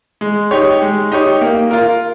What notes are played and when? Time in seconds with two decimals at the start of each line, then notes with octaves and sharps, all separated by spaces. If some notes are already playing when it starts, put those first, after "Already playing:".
0.21 G#3
0.51 D#4 G4 C#5
0.82 G#3
1.12 D#4 G4 C#5
1.41 A#3
1.71 F4 A#4